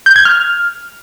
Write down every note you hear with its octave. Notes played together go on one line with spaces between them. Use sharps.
G6
G#6
F6